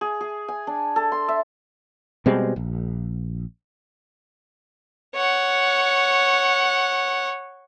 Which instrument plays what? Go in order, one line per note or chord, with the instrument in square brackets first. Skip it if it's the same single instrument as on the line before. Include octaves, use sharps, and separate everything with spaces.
[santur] G#4
G#4
G#5
D4
A4
C6
E5
[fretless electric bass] B2 G3 G#3 C4
A#1
[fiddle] C#5 F#5